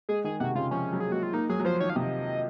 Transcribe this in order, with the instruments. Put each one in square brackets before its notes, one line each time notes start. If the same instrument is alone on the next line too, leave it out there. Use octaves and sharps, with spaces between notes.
[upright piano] G#3 [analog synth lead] G#4
[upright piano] D#3 [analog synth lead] G#4
[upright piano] C3 [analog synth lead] F#4
[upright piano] C#3 [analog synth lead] F4
[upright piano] F3 [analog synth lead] C#4
[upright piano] F#3
[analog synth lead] G#4
[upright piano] A#3
[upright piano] G#3 [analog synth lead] F#4
[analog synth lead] F4
[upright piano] A#3 [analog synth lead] D#4
[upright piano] F#3 [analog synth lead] G#4
[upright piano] F#3
[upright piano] F3 [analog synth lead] C5
[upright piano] D#3 [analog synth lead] C#5
[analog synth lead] F5
[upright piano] C3 [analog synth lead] D#5